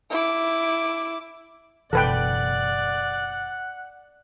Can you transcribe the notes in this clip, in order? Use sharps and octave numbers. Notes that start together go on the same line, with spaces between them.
E4 D6
F#1 B2 E3 A4 B4 D5 F#5 G5